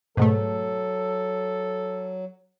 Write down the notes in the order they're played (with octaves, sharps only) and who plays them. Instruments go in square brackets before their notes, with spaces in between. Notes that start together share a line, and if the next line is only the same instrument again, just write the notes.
[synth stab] G#2 B2 A3 [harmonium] F#3 [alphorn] A4